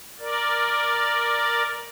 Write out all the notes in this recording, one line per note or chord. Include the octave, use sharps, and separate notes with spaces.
A#4 D5